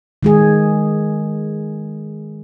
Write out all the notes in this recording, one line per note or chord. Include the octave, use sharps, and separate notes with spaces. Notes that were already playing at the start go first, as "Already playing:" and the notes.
D#3 G#3 G#4